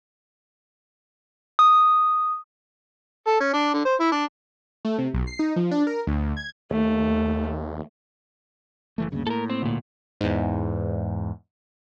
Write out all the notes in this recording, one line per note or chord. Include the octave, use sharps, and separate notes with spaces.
D#6
A4
C#4
D4
D3
C5
E4
D4
A3
C3
B1
C7
D#4
F3
D4
A#4
D2
G#6
D#2 A3
F#1 E3 A3
D2 G2 C#3 A#3
A2 A4 A#4
C4
D2 A#2
E2 G#2